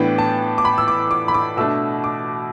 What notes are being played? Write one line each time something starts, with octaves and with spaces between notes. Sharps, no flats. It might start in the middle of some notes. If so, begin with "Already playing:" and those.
Already playing: A2 E3 B3 D4 G5
A5
D6
B5
E6
D6
D6
B5
D6
B2 A3 D4 E6
D6